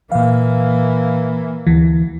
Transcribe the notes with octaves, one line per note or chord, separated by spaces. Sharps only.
A#2 E3 A#3 F5
D2 E3